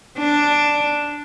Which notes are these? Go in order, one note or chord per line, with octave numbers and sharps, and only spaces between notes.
D4